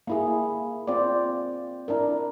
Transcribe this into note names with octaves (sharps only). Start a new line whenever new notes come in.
A#3 E4 G#4
C4 F4 C5 D5
D4 E4 A#4